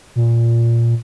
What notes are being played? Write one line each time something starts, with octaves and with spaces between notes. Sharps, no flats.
A#2